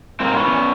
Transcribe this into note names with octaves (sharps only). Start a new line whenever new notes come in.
G#2 A#3 C4
E3 B3 C#4